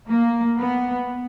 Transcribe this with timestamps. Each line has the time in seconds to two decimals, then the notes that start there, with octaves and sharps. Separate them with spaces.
0.09 A#3
0.59 B3